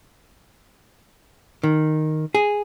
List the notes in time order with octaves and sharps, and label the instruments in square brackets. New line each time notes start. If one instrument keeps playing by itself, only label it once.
[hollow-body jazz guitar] D#3
G#4